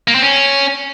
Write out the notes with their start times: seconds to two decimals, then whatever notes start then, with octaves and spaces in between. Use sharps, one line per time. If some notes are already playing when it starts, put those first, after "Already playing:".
0.08 A#3
0.15 C4
0.22 C#4